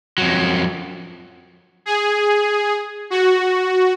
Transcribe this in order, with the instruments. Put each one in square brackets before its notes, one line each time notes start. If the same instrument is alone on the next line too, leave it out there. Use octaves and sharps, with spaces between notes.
[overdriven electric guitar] F2 F#3
[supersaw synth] G#4
F#4